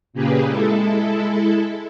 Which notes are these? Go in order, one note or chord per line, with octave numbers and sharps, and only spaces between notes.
A#2 C#3 A#3 G4 G#4 B4
G#3 E4 A4